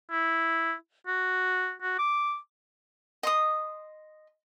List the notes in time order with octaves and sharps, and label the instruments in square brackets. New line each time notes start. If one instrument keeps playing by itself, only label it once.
[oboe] E4
F#4
F#4
D6
[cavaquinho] D#5 C6 D#6